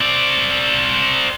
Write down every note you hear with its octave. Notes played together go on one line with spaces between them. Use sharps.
C4 D5